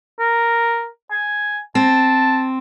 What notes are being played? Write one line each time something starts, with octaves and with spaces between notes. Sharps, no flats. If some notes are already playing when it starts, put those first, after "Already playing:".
A#4
G#5
C4 A5